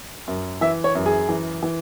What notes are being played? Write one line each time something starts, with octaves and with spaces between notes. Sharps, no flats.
F#2
E3 E5
C#5
F#2
G#4
E3
E3